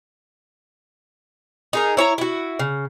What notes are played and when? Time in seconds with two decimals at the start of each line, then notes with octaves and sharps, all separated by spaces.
1.73 D#4 G#4 A#4
1.97 E4 C#5 G#5 A#5
2.18 E4 F#4
2.59 C#3